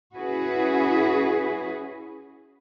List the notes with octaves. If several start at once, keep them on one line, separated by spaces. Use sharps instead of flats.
C#4 E4 F#4 G#4 B4